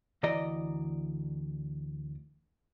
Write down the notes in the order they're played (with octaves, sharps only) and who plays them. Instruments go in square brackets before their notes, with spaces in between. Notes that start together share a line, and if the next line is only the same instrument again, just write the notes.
[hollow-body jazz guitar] D2 E3 D5 D#5 A#5